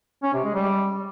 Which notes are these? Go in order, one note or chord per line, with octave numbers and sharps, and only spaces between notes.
C#4
C3
G#3
G3